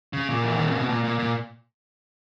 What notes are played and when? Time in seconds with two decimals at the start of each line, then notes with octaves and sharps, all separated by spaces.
0.13 C#3
0.29 A#2
0.44 E3
0.55 D#3
0.66 C#3
0.78 B2
0.89 A#2
1.04 A#2
1.19 A#2